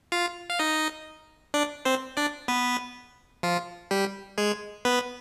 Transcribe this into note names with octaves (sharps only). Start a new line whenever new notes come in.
F4 F5
F5
D#4 D#5
D4 D5
C4 C5
D4 D5
B3 B4
F3 F4
G3 G4
G#3 G#4
B3 B4